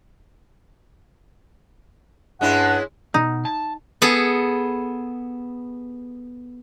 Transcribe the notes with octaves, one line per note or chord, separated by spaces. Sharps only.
G2 G#3 C#4 D4 E4 F#5
B2 D#4
A5
B3 G#4 A4